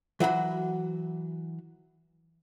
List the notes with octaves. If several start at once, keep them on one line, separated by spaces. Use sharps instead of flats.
E3 F#3 F#4 B5